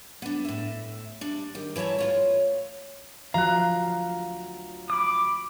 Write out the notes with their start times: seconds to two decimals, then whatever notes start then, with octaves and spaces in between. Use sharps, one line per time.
0.22 B3 D4
0.45 A2 E5
1.21 G3 D4
1.55 D#3 G4
1.76 E3 E4 C#5 A5 A#5
1.99 A3 F4 C#5
3.34 D2 F3 F#3 F5 A#5 F#6
4.90 B5 D6 D#6